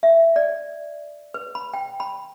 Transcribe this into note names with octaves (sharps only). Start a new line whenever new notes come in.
E5
D5
B4
B5
G5
B5